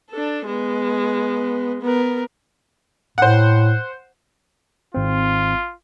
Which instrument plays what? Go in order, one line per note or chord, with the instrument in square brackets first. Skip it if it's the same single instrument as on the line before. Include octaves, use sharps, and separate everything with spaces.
[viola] D4 A4
G#3 B3
B3 A#4
[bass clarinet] A2 [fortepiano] C5 F#5
[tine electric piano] G#1 C4 [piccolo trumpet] F4